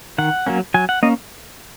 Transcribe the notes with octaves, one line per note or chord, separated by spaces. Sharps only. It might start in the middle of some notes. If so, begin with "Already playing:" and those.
D#3 F#5
F#3 A#3 C#4
F#3 G#5
F#5
A#3 C#4 D#5